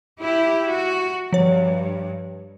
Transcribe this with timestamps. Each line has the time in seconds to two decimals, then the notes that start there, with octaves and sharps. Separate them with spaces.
0.20 E4 G4
0.70 F#4
1.33 G2 F3 C#5